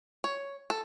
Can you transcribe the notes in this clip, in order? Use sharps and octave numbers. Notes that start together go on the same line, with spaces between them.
C#5
A4